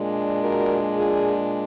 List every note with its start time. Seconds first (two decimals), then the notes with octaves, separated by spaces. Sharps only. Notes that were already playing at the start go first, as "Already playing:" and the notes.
Already playing: A#2 G#3 D4
0.40 F#4 A#4
0.95 F4 G#4